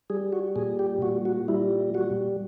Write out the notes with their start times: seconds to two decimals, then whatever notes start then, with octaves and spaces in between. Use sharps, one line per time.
0.10 G3 G#4
0.33 F#4
0.56 A#2 G#4
0.79 G4
1.02 A#2 F#4
1.25 F#4
1.48 G3 E4
1.94 G3 F#4